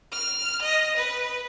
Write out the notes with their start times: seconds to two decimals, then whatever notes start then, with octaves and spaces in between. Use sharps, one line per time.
0.13 F6
0.61 D#5
0.96 B4